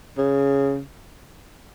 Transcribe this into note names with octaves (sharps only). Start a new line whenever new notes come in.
C#3